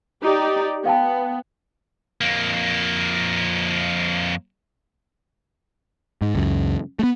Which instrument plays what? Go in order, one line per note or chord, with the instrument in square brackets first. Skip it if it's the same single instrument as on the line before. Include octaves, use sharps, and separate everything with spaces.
[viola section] D#4 G4 D5
[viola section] B3 [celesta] F5 G5 A5
[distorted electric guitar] F2 A#3
[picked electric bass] G#2
C#2 F#2
A3 B3